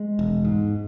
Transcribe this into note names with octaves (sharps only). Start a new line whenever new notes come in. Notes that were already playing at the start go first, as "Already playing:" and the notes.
Already playing: G#3
E1
G#2